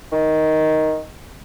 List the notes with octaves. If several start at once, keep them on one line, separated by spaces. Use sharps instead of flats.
D#3